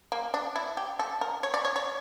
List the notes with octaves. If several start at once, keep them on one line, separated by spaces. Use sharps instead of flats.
A#3
D4
E4
G4
A4
A#4
C#5
D5
C#5
C#5